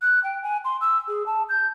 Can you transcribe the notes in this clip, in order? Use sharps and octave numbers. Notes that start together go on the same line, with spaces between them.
F#6
G5
G#5
C6
E6
G#4
A5
G6